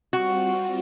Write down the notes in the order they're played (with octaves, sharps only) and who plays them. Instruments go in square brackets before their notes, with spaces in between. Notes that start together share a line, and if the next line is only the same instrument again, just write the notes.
[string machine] G3 C4 F4 [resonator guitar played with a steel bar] F#4